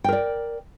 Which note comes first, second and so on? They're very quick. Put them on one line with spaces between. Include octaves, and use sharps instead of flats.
G5 A#4 D5